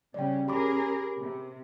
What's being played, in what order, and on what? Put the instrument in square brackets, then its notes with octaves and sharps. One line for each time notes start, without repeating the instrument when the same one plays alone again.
[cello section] C#3 G3 C#4 [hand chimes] D5 G5
[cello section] C#4 G#4 A#4 [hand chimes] G4 B5 D6
[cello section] C3